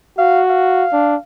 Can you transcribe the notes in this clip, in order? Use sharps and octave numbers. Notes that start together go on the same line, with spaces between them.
F#4 F5
F5
D4